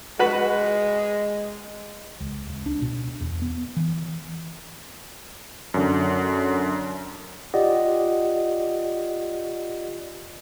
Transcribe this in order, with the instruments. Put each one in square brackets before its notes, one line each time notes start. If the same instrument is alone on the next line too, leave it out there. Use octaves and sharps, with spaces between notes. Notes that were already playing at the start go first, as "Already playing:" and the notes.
[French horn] G#3 [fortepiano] F#4 B4 B5
[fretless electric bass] C#2
C#2
D4
B2
E2
B3
E3
[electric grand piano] F#2 D3
[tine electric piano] F4 G4 D5 D#5 F#5